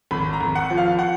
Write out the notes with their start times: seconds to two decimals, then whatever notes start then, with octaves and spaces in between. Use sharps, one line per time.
0.11 G#1 B5
0.33 A#5
0.41 G#1
0.55 F#5
0.70 F3
0.77 F5
0.99 F#5